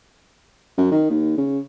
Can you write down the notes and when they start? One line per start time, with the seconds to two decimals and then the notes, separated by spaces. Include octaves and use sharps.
0.78 F#2
0.91 D#3
1.10 D#2
1.38 C#3